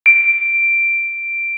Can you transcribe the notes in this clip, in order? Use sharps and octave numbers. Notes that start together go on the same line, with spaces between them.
D7